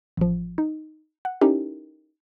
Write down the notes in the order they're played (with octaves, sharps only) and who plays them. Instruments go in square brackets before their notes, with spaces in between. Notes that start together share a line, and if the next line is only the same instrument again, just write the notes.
[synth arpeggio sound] A1 F3
D#4
F#5
C#4 D#4 E4 G4 A4 A#4